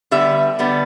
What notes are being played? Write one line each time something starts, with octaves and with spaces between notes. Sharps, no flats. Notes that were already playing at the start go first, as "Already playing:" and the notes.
D3 G3 B3 E5
D3 G3 B3